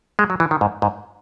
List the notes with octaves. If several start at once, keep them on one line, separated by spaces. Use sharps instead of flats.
G#3
F#3
E3
D#3
G#2
G#2